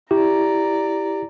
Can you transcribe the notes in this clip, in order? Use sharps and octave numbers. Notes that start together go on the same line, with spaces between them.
E4 G4 D5 A#5